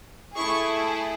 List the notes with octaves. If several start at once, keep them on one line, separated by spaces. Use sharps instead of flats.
A3 E4 G#4 C#6